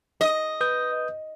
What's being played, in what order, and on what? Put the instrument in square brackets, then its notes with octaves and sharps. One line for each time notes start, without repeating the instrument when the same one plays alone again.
[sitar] D#5
[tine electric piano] B4 D#6 G6